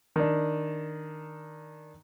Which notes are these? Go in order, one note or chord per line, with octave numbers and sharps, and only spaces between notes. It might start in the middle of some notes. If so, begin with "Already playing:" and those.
D#3 D4